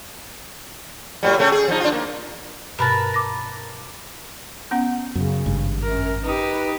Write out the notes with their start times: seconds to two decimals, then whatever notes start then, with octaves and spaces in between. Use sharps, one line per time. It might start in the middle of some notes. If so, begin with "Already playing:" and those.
1.23 A2 F#3 G3
1.38 C#3 A3 C#4
1.52 G#4
1.68 F3 D#4
1.80 D4 F4
1.92 A#3
2.79 G2 B2 A#4 B4 A5
3.14 D6 A#6
4.71 B3 C#4 F#5
5.15 F#2 C#3
5.46 G#1 G2
5.83 F#2 A#4
6.24 D#4 G4 B4